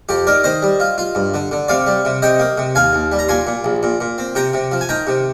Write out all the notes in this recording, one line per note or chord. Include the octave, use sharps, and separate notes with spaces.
F2 G4
D#3 A#4 D5
D#3 C5 D#5
G3
F4
F4
G2
D3
D3
C3 D5 F5
G3
C3
C3 D#5 G5
A#3
C3
D#2 F5 G#5
D#2
G3
A#5
A#2 G#5 C6
A#2
A#1
A#2
A#2
C4
C3 G5 A#5
C3
F3
G#5
D#3 G5 A#5
C3